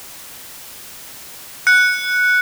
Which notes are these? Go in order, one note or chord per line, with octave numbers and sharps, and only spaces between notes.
F#6 C#7